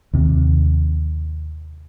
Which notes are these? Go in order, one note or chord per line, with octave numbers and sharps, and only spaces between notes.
D#2 C3